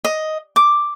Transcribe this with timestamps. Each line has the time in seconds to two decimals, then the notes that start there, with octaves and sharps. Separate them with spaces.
0.05 D#5
0.56 D6